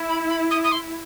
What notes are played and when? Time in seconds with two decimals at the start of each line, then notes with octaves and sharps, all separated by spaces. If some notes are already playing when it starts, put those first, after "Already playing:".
Already playing: E4
0.08 B5
0.29 B5
0.50 D#6
0.64 D#6
0.71 C6